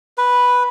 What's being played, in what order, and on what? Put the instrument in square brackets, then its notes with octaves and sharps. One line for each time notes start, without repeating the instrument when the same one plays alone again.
[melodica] B4